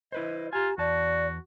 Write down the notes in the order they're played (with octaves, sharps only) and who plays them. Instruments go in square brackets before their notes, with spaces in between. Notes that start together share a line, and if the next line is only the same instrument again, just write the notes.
[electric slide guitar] E4 B4 C5 [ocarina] D#5
[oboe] F4 [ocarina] G4 [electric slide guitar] G#5 A#5
[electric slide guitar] E2 A5 [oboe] F#4 [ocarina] D5